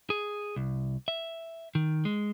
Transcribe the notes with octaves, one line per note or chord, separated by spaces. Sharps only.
G#4
C2
E5
D#3
G#3